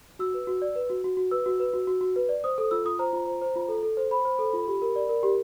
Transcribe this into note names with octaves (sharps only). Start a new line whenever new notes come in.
F#4 E6
B4
F#4
D5
B4
F#4
F#4
F#4
B4 E6
F#4
B4
F#4
F#4
F#4
B4
D5
C5 D#6
A4 D#6
F4 E6
F4 D#6
C5 A#5
F4
C5
C5
F4
A4
A4
C5
C5 B5
C5
A4
F4
G4
A#4
D5
A#4
G4